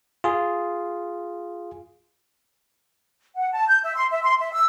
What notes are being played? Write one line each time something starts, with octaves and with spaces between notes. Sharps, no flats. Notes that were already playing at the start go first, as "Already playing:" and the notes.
F4 G#4
F#5
A5
G6
E5
C6
E5
C6
E5
E6